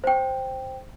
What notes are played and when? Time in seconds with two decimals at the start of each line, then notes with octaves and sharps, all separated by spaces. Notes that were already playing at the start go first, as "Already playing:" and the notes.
0.04 C5 G5